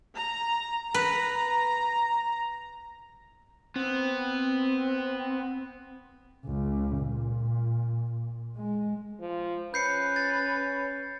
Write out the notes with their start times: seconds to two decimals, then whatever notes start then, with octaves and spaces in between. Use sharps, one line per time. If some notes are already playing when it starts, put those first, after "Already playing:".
0.14 A#5
0.94 B4 A#5
3.76 B3 C4
6.45 C#2
6.99 A#2
8.56 G#3
9.21 F3
9.74 C#4 B4 G6 C7 C#7
10.16 A6